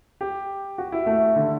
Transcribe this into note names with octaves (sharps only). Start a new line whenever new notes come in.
G4
F#4
E4
A3
D3